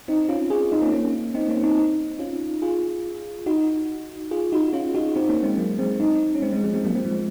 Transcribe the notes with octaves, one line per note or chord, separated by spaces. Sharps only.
C4 D#4
C#4 F4
F4 G#4
C4 D#4
A#3 C#4
A#3 C#4
C4 D#4
A#3 C#4
C4 D#4
C#4 F4
F4 G#4
D#4 F#4
F4 G#4
D#4 F#4
C#4 F4
D#4 F#4
C4 D#4
A#3 C#4
G#3 C4
F#3 A#3
G#3 C4
C4 D#4
C#4
G#3 C4
G#3 C4
F3 G#3
G#3 C4
F#3 A#3
G#3 C4
F3 G#3